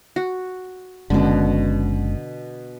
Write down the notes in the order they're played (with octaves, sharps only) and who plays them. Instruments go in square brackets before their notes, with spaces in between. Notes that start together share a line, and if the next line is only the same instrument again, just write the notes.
[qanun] F#4
[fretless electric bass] F#1 G#3 C#4 [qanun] B2 D3